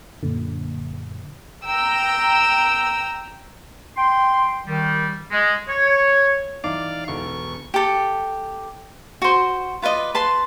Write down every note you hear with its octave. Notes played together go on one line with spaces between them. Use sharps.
F#2 A#2 D3
G5 A#5 E6
G5 C6
D#3 G3
G#3
C#5
E3 D4 D#4 D5 F5 D6
E1 D3 C#6
G4 A4
F#4 C5
F4 B4 D5 D#5
B4 A5 C6